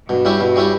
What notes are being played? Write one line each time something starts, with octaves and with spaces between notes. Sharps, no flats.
G2 B2
G3 C#4 E4 G4
B2
G3 C#4 E4 G4